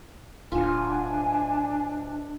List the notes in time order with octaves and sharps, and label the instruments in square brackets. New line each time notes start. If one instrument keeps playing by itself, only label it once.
[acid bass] D1 [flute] D4 [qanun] F4 [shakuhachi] G#5